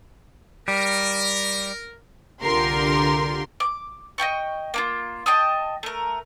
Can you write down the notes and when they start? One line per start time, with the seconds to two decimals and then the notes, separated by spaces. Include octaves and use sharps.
0.68 G3 A#4
2.43 C2 D3 F4 G4 A#4 C6
3.60 D6
4.18 D#5 E5 G5 C#6
4.74 A#3 D4 F4
5.26 D#5 G5 A5 D#6
5.83 A3 A#4